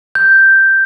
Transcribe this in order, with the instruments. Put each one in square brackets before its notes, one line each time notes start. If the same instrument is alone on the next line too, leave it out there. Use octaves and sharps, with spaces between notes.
[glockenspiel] G6